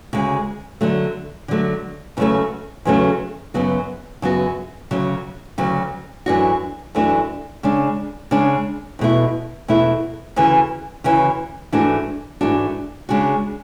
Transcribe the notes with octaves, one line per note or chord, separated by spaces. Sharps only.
D2 C#3 G#3
D3 F#3 A3
D3 F#3 A3
E2 C#3 F#3 A3 C#4
E2 C#3 F#3 A3 C#4
F#2 C#3 F#3 B3 F#4
F#2 C#3 F#3 B3 F#4
D2 C#3 F#3
D2 C#3 F#3
F#2 E3 A3 D4 F#4
F#2 E3 A3 D4 F#4
C#3 G#3 D4
C#3 G#3 D4
E2 B2 A3 E4
E2 B2 A3 E4
D2 C#3 E3
D2 C#3 E3
G#2 E3 A3 D4 F#4
G#2 E3 A3 D4 F#4
C#3 G#3 D4 F#4